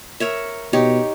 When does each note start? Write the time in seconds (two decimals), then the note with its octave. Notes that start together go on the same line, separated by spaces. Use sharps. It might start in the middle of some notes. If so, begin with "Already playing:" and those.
0.20 A#4 C#5 E5
0.73 B2 D#4 G4 C#5